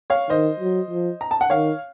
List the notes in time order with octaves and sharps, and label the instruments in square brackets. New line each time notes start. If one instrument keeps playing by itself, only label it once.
[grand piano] C#5 F5
[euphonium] D#3 [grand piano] C5 D#5
[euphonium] F#3
F3
[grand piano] A#5
A5
F#5
[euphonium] D#3 [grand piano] C#5 F5